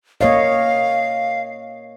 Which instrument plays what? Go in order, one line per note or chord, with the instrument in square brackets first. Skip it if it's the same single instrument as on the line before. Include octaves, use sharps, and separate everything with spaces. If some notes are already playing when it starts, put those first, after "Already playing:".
[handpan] A#3 C#5 D#5 [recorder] F5